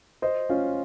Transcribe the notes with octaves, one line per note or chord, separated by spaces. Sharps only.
C5 D#5
C#4 F4